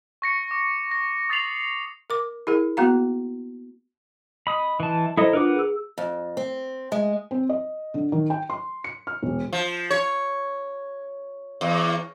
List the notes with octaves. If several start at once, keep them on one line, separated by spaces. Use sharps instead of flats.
C#6 A#6 C#7
D6
A#6
D#6 A6 A#6 C7 F7 F#7
A#4 D6
E4 G#4 A#4
A#3 B3 F#4 F5 A#5
D#5 B5 D#6
E3 A5
E4 A4 C5 D#5 A#5 D#6
D4 F4 A#4 B4 F#5 D6
G#4 E6
F2
C4
G#3
C4
D#5
D3
D#3
G5
C6
C#7
F6
E1
F3
C#5
E2